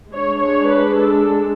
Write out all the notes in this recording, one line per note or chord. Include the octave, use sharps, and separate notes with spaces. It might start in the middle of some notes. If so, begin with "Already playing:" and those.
G#3 D4 C#5
C#5
B4
A4